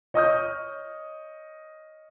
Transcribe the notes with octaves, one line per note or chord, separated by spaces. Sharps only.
C#5 D#5 C#6 D#6 F6 G6